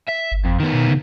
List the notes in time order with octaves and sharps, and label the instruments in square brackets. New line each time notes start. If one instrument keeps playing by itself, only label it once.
[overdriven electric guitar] E5
[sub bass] G1
[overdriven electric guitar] F2
D#3 B3
[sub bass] B2
C#3